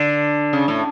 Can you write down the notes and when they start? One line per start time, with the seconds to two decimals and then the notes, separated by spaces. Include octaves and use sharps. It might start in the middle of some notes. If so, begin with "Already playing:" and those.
Already playing: D3
0.53 C#3
0.68 A2